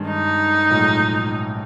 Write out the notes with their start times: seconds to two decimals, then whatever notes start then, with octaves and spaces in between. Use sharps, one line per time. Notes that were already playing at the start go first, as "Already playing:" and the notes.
Already playing: G2 D#3 G#3 C#4
0.09 D#4
0.70 B1 A2 F3 G#3